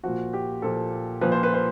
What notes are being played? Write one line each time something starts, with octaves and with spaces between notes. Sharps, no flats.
A#2 F3 F#4
G4
A#2 F3 A4
A#2 F3 B4
C5
B4
C5